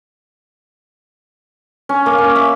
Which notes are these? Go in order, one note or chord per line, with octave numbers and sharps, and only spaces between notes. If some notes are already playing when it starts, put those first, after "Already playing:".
C#4
A#3
C#4
E5